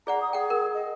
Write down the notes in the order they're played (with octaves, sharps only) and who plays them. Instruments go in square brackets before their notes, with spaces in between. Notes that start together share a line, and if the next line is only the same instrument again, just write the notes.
[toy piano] G#4 D5 F#5 [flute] A#5
[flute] D#6
[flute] G#4 [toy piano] F#5 G5
[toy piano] A#4
[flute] D#5